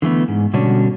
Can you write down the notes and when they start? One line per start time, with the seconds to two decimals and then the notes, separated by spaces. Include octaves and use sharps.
0.02 D3 E3 A3 B3
0.28 G#2
0.53 B2 D3 G3 C#4 D4 F#4